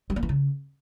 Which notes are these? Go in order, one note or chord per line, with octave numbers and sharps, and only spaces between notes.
G3
A#3
E3
C#3